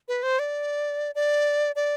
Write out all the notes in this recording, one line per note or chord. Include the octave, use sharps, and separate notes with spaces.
B4
C5
D5
D5
D5